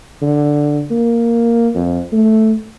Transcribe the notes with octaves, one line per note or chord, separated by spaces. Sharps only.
D3
A#3
F2
A3